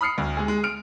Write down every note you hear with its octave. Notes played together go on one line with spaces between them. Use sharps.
B5 D#6 F6 C7 C#7
D2
G#3 G#4
G#3
F6 D7